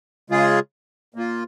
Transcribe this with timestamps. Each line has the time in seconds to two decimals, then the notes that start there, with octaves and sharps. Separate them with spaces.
0.30 C#3 G#3 F4 G#4
1.14 A#2 A#3 F4